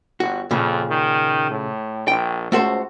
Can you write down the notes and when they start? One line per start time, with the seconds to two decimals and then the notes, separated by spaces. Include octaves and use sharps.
0.20 G1 F#4
0.51 F2 A#2 C#3
0.90 D#3
1.51 A2
2.08 A#1 G5
2.52 C#2 A3 F#4 C5